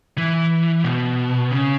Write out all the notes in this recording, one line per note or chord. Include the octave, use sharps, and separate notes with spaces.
E3
B2
C#3